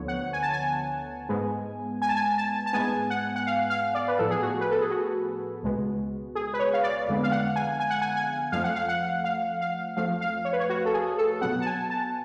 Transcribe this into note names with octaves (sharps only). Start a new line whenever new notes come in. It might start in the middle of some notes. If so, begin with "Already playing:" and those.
Already playing: D2 D3 F3 B3 C#5
F#5
G#5
A5
G#5
G#2 G#3 B3
G#5
A5
G#5
A5
A5
G#2 G#3 B3 G#5
F#5
F#5
F5
F5
D5
B4
A2 F3 B3 A4
G#4
F#4
B4
A4
G#4
F#4
C#2 B2 G#3 B3
G#4
B4
C#5
F5
D5
F2 D3 G#3 B3
F5
F#5
G#5
G#5
F#5
G#5
G#5
F2 F3 A3 F5
F#5
F5
F#5
F5
F5
F2 F3 A3 F5
F5
C#5
B4
C#5
F#4
A4
G#4
A4
B2 F#3 B3 F#5
A5
G#5
A5